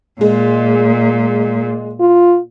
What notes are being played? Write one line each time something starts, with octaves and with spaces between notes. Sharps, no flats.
A#2 G#3
F4